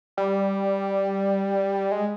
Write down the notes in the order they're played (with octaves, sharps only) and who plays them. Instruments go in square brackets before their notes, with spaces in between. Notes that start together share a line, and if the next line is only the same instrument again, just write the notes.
[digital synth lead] G3
G#3